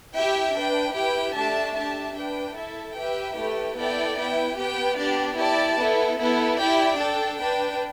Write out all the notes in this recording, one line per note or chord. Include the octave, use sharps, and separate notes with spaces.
E4 G4 E5 G5
D4 B4 G5
E4 G4 B4 G5
A3 D4 G4 E5 A5
D4 G4 E5 A5
D4 B4 G5
E4 A4 E5
G4 B4 E5 G5
A3 E4 G4 B4 G5
B3 E4 A4 D5 G5
B3 E4 B4 G5
B3 G4 B4 G5
B3 D4 G4 D5
E4 G4 D5 A5
B3 E4 A4
B3 E4 A4
E4 G4 D5 G5
D4 A4 G5
D4 B4 G5